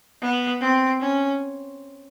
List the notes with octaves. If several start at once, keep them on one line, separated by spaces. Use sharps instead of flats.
B3
C4
C#4